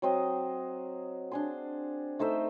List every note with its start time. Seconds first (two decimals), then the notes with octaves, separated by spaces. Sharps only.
0.02 F#3 C4 D#5
1.32 D4 G#4 C6
2.19 A3 D#4 C5 E5